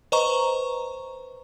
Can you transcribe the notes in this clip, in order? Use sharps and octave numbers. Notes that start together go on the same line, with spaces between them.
B4 C5 D#5 A#5 C#6